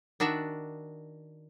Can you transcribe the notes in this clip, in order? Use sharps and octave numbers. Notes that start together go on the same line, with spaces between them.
D#3 D4 F#4 D5 E5